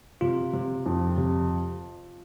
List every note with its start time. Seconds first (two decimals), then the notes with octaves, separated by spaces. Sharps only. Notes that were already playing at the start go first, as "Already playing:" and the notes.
0.21 C3 F4
0.53 C3
0.86 F2
1.18 C3